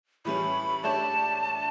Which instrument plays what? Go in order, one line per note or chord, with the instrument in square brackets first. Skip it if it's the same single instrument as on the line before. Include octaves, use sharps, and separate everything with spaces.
[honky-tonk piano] A2 E3 G3 C#4 [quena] B5
[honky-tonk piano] A3 D4 G4 C#5 [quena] A5